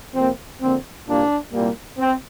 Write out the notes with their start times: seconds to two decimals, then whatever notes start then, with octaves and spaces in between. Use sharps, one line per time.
0.14 F2 C3 A#3 C4
0.61 F2 D3 A#3 C4
1.07 C2 A#2 G3 A#3 D4
1.53 C2 A#2 G3 A#3
1.99 C4